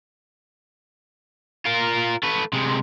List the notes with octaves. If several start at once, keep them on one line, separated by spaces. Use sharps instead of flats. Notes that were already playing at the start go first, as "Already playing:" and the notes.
F4 A#4
A3 B4
C3 G#3